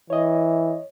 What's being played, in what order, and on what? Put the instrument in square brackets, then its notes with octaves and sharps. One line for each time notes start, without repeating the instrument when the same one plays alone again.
[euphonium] E3 [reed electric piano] C#5 D#5